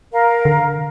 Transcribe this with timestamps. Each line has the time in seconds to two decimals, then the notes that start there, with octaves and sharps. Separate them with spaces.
0.12 A#4 F5
0.45 D3